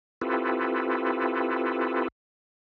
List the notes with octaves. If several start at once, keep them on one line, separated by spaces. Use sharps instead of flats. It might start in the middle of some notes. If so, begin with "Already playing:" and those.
C4 E4 F4 G4 A4 B4